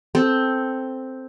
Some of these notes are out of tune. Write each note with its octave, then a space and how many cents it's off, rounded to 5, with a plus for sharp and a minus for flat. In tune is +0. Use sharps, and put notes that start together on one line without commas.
C4 +0 A4 +0